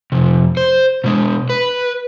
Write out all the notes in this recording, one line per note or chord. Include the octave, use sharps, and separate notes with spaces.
F2 C3
C5
B2 G#3
B4